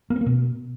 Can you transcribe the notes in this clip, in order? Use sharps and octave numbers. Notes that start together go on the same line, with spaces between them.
A#3
C4
A#3
B2